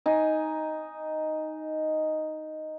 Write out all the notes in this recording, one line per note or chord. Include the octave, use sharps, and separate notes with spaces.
D#4 G#5